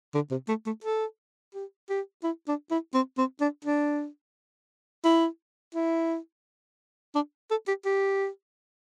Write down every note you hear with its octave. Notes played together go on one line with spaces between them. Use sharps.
D3
C3
A3
A3
A4
G4
G4
E4
D4
E4
C4
C4
D4
D4
E4
E4
D4
A4
G4
G4